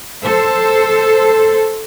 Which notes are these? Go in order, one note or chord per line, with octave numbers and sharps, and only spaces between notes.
A4 C5